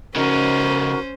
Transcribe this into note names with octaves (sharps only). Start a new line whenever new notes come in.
C#3 C#4 D#4 F#4 A#4 C5